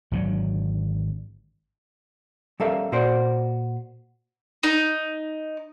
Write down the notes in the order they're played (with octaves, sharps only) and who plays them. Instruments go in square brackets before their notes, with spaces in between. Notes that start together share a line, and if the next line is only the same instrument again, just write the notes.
[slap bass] G#1 D3 F#3
[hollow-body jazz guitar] G3 C#4 A4 A#4 E5 F5
A#2 F#4 A#4 C5 D5
[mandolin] D#4